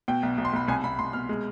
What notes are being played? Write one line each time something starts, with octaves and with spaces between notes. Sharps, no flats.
B2 G5
B1
B1
C6
B1 B5
C2 G#5
C2 B5
C2 C6
B2 F6
G#3